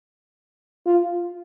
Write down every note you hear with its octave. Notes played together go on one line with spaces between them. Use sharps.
F4